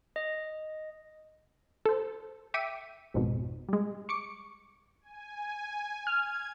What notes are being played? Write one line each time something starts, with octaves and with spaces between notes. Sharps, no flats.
D#5
A4 C5
E5 G5 D6 B6 C#7 D#7
G#1 F2 G#2 B2
G3 G#3
C#6 D6 C#7
G#5
F6 G#6